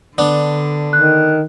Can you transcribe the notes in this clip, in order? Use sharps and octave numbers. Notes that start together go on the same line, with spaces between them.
D3 B3 D4
D#3 F#6